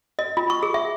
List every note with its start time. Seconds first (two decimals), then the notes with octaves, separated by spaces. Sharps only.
0.19 D#5
0.37 F4
0.50 C#6
0.63 G#4
0.74 E5